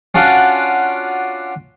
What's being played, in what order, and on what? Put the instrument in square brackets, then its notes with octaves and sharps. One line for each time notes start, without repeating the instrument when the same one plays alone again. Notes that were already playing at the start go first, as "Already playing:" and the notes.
[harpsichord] C#4 D4 F4 F#4 D5